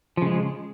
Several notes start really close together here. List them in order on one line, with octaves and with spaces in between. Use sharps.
F3 C#3 G#3